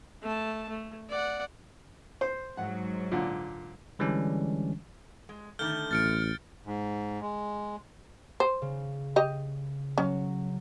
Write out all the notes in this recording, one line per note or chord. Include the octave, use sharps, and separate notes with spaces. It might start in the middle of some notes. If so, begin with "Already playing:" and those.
A3 A5
A3
D5 F#5
C5
G#2 F#3 F#5
A#2 D3
D3 E3 G3 G#3 C#4 D4
G#3
D3 D#3 A3 F6 G6 G7
A1 F6 A6 C#7 D7
G#2
G#3
C5
C#3
G4 D#5
F#3 C#4